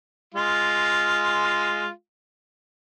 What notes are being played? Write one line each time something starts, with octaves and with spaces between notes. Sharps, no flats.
G#3 F4